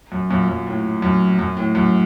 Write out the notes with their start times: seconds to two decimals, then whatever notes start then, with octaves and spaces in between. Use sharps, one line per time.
0.12 F#2
0.30 F#2 A#2
0.49 F#2
0.67 A2
1.02 F#2
1.39 F#2
1.57 A2
1.75 F#2